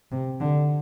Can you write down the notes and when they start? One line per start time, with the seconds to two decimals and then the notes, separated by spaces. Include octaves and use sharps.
0.12 C3
0.41 D3